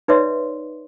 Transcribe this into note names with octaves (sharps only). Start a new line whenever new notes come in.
D#4 B4 C#5 D5 E5 C6